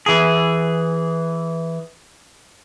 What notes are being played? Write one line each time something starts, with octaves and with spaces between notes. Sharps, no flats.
E3 G#4